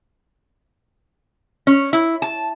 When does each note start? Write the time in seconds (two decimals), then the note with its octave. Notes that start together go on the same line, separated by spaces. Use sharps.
1.67 C#4
1.93 E4
2.22 A5